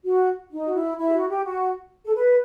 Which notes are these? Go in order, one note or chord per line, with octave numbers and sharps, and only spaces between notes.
F#4
D#4
F#4
E4
E4
G4
F#4
G4
F#4
A4
B4